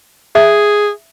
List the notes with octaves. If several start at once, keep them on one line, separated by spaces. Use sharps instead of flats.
G#4 E5